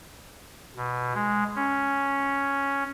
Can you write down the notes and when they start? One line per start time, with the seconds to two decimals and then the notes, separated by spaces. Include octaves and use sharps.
0.76 B2
1.14 G#3
1.56 C#4